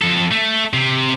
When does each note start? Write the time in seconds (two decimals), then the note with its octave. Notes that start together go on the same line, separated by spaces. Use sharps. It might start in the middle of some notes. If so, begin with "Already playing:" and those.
0.02 F2 A4
0.31 A3
0.73 C3